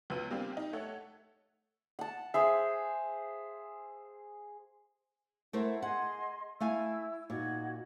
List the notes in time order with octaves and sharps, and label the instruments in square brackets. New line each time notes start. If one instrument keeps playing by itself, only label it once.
[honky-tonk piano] C#2 B2 B3 B4 E6 D#7
G3 A#3 C4 D4
D#4 G4
A3 A4 C#5 F#5
[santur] F#5 A5
[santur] G#4 C5 F5 [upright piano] E5
[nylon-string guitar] A3 A#4 C5 [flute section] E4 F#5
[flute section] G#4 D#5 C6 [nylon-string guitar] F#5
[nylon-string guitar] A3 F5 G#5 [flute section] E4 E6
[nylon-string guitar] A#2 [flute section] D#4 F#4 G#6